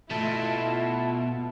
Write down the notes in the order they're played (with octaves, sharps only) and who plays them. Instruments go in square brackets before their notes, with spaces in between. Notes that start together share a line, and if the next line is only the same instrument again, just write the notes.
[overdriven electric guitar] B2 [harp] A3 A6 [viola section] E4 F4 [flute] A5